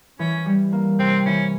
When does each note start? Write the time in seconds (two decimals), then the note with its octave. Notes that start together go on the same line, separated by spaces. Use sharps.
0.19 E3 C#4
0.46 G3
0.72 A#3
0.99 C3 C4
1.26 E3 C#4